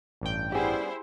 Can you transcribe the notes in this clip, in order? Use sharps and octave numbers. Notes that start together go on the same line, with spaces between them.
A1 G2 G5
G3 B3 C#4 E4 G4 G#4 C5